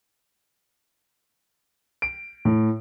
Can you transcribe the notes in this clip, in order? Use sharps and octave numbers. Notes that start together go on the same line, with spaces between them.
D7
A2